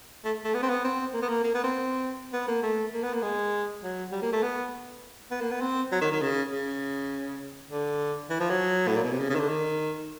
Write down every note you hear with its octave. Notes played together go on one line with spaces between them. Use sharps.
A3
A3
B3
C4
B3
C4
A#3
B3
A#3
A#3
B3
C4
B3
A#3
A3
A#3
B3
A#3
G#3
F#3
G3
A#3
A3
B3
B3
A#3
B3
C4
F#3
D#3
D#3
C#3
C#3
D3
E3
F3
F#3
A2
A#2
B2
C3
C#3
C#3
D#3
D3
D#3